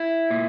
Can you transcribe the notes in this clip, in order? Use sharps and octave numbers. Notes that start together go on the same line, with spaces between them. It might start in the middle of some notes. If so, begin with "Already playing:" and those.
Already playing: E4
A#2